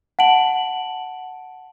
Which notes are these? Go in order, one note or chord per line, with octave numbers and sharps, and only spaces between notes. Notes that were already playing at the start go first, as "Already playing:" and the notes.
F#5 A5 D7 F#7